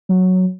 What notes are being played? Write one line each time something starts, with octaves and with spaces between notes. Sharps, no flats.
F#3